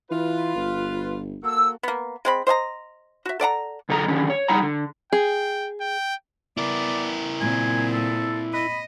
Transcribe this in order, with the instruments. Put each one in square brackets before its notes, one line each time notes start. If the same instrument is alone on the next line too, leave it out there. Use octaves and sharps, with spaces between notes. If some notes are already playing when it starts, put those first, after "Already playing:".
[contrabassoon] E3 [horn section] F4 B4
[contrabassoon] G1
[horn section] A#3 F#4 A4 [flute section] E6
[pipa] A#3 B3
G#3 C4 B5
C5 D#5 G#5 A#5
F#4 E5
A4 D5 F#5 A#5
[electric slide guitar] F#2 D3 A4 D#5 A#5
D3 D#3 F#3 C#4
C#5
G3 D#4 E4 F#5 A#5
D3
[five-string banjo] G#4 [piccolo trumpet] G5
[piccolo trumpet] G5
[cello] B3 [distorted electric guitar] E4 A#4 [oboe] D5
[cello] A#2 C4 [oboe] G#5
[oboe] A4
[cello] D#5 [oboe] B5